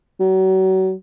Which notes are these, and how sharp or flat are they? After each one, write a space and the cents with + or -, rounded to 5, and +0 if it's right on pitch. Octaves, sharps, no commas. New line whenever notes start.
F#3 +35